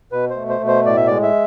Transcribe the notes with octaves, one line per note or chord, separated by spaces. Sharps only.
B2 B4
C5
A3
C5
B2
C5
A2 D5
E5
G#3 D5
E5